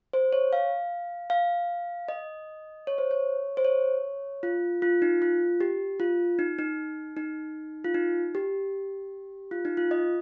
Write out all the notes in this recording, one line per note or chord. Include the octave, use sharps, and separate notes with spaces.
C5
C#5
F5
F5
D#5
C#5
C5
C#5
C5
C#5
F4
F4
D#4
F4
G4
F4
D#4
D#4
D#4
F4
D#4
G4
F4
D#4
F4
D#5